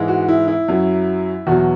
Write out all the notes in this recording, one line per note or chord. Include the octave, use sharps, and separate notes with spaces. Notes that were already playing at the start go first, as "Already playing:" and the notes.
Already playing: G#2 E3 G#3
F#4
E4
E4
F#2 F#3
E2 B2 F#3 F#4